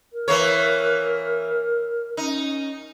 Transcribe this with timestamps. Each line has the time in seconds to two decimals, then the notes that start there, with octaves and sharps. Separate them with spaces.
0.12 A#4
0.28 E3 A#3 C#5
2.17 C#4 D#4